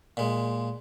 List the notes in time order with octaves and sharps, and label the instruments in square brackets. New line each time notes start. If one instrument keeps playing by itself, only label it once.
[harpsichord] A#2 G#3